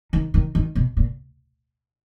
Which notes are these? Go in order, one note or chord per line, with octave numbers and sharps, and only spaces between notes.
D#3
D#3
D#3
B2
A#2